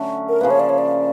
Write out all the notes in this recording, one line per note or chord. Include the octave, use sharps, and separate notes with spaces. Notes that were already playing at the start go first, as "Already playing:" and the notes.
Already playing: D3 F#3 A3 C#4
A#4
C#3 F3 A#3 B4
C#5
D5
C#5
D5